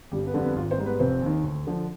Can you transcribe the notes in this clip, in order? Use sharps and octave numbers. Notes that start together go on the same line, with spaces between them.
G1 G3 G4
B3 B4
F2 D3 G3
B3 B4
G#1 F4
C4 C5
G#2 G3
B3 B4
B4
F1 C4 C5
D#2 D#3
D2
D3 F3